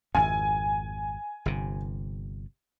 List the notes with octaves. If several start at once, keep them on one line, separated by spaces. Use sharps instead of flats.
G#1 F2 G#5
G1 C3